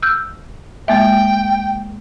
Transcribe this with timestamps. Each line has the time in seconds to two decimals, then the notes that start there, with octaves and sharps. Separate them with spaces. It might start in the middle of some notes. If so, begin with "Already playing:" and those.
0.02 E6 F6 G6
0.88 G#3 A#3 E5 G5